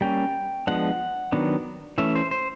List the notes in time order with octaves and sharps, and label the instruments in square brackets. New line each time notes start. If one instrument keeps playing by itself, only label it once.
[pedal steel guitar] G3 A#3 C#4 G5
F3 G#3 B3 D4 F#5
D#3 F#3 B3 D4
E3 A3 C#4 E5
C5
C5